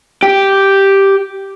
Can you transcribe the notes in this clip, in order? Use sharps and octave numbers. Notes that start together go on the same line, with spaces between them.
G4